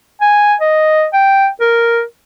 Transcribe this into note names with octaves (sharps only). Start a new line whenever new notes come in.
G#5
D#5
G5
A#4